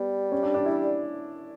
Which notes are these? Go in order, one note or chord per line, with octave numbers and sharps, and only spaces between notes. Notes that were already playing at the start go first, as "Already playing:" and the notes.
Already playing: G3 B3
C#4
D4
D4
E4